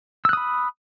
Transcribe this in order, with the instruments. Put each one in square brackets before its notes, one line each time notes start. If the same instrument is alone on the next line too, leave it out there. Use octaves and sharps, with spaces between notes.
[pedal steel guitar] E6
F#6
D#6
B5